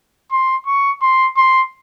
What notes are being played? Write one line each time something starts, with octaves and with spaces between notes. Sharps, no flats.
C6
C#6
C6
C6